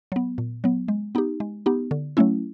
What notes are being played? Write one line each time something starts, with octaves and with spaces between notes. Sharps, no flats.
F#3 B3
A#2
F#3 B3
G#3
B3 D#4 G4
G#3
B3 D#4 G4
D3
F#3 A3 C#4 E4